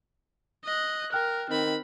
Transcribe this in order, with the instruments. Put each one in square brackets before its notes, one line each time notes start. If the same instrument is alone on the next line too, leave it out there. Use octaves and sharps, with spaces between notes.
[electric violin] D#5 F#6
[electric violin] A#4 [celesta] G5 F6 F#6
[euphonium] D#3 [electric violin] C4 B5